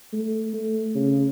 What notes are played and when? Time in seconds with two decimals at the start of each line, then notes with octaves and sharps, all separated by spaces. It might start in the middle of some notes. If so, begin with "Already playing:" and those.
0.13 A3
0.53 A3
0.95 C#3